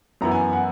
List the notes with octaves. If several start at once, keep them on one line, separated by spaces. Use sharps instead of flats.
F#2 E3 B3 E4 A#5
G#5
F#5